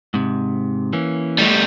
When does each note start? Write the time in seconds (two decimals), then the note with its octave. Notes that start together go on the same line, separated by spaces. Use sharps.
0.14 G#2 C3
0.93 E3 A#3 C#4
1.38 G3 A3